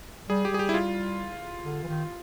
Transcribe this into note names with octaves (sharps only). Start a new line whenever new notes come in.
G3 G#4
G4
G3 G#4
G4
E4
F4
D3
E3
D#3